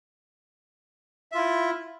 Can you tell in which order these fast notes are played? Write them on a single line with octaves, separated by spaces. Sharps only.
E5 F4 E4